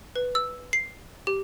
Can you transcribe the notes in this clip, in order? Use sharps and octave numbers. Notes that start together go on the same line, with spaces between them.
B4
E6
C7
G4